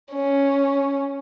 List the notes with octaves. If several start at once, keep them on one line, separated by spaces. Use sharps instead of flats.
C#4